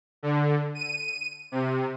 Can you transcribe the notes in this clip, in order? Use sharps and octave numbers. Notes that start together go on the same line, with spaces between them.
D3
D#7
C3